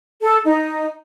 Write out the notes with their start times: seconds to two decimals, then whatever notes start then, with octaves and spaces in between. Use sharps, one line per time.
0.22 A4
0.44 D#4